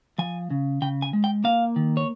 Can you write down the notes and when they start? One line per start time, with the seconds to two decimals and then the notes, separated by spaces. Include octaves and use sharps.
0.18 F3 G#5
0.50 C#3
0.82 C#3 G5
1.02 G#5
1.13 G#3
1.24 G5
1.44 A#3 F5
1.76 D#3
1.97 C#5